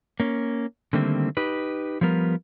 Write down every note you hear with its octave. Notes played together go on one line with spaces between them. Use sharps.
A#3 C#4
D3 D#3 G3 A3 A#3 C4
D#4 G4 B4
F3 G3 B3 A#4